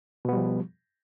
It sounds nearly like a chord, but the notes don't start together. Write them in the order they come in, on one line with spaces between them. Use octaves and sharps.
B2 B3 G3 F3